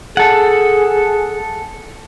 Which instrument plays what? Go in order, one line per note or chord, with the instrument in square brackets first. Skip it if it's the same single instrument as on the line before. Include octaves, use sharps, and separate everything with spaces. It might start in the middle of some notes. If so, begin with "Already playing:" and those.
[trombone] G#4 [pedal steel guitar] A4 F#5